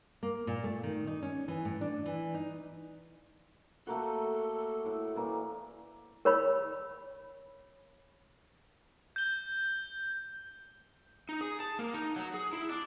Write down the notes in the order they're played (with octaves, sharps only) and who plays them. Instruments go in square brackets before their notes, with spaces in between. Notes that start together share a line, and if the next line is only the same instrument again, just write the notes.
[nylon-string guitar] A#3
A#2
A3
D#3
D#4
C#4
E3
A2
D4
E3
D#4
[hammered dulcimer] A3 A#3 F#4 [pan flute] A4
[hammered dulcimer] A2
E3 A#3 D5
[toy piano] A#4 C#5 B5
[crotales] G6 G7
[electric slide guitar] D#4
G#4
A5
A#3
D#4
F#3
G#4
E4
D4